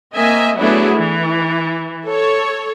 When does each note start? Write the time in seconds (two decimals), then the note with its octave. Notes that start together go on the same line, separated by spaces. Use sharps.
0.15 A#3 C4 D#5 E5 G#5
0.56 F#3 A3 B3 D4 E4 G#4
0.95 E3
2.05 A4 C#5